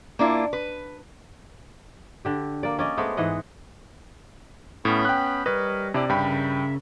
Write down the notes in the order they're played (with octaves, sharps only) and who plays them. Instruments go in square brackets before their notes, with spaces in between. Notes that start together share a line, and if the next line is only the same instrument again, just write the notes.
[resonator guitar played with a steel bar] A#3 D4 E4 F4
B4
[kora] D3 G4
A#3 D5
C#4 D5 D#5
G#3 A3 B3 C5
G#2 E3 D#5 F#5
[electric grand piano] A2 [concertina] B3 C#4 B5
[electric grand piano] G5 F#6
[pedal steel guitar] G3 C#5 D#5 [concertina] A#4 [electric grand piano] B4
[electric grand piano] C3 D5 [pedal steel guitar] D4 E4 G4
[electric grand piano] G2 G5 B5 [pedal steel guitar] C#3 C#4 A#4 [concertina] E5